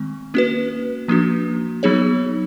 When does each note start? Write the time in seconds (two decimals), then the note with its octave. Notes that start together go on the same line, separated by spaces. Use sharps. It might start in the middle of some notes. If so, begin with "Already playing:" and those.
Already playing: D#3 G#3 C4
0.34 A#3 C#4 F#4 B4
1.08 F3 A#3 D4 F#4
1.83 F#3 B3 D#4 G#4 C#5